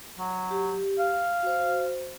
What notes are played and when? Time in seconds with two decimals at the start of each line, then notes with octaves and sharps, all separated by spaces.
0.19 F#3
0.51 G4
0.99 F5
1.43 F#4 C5